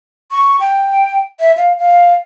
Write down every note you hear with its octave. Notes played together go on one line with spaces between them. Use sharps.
C#6
G5
E5
F5
F5